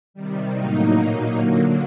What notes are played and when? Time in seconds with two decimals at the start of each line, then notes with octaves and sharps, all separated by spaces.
0.14 C3 D#3 G3
0.54 A2 F#3 A#3 D#4
0.95 A#2 F#3 A#3 D#4
1.35 D3 F#3 A#3